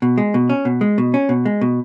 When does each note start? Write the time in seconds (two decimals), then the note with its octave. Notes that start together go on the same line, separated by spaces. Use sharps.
0.02 B2
0.18 G#3
0.34 B2
0.49 C#4
0.65 B2
0.81 G#3
0.98 B2
1.14 C#4
1.29 B2
1.45 G#3
1.61 B2